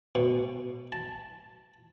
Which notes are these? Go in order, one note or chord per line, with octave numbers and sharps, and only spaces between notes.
B2
A5